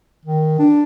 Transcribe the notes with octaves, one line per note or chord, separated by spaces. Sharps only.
D#3
D4